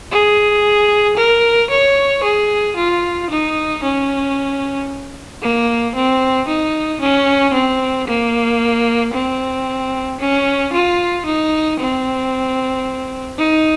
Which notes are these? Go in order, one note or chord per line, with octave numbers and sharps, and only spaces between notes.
G#4
A#4
C#5
G#4
F4
D#4
C#4
A#3
C4
D#4
C#4
C4
A#3
C4
C#4
F4
D#4
C4
D#4